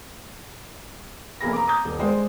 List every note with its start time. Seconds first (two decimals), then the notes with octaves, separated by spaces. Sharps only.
1.41 F1 A#3 G#4 B5 A#6
1.53 A#5 D6
1.66 A#5 D#6 G6
1.85 D#1
1.99 G#3 C5 D5